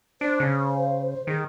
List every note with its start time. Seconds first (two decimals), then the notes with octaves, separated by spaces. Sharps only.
0.21 D4 C5
0.40 C#3
1.27 D#3 G#4